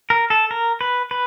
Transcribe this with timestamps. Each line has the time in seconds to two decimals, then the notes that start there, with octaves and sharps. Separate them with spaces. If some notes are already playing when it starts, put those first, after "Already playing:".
0.10 A#4
0.30 A4
0.51 A#4
0.81 B4
1.11 B4